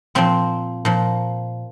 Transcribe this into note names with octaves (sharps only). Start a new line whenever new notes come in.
A#2 F3 C4
A#2 F3